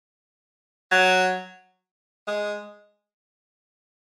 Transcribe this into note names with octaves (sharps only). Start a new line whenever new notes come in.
F#3
G#3